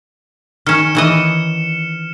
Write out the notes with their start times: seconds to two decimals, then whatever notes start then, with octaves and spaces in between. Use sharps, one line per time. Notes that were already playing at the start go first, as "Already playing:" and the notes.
0.67 D#3 C#4 F6 C#7 E7
0.95 D#3 E3 D#5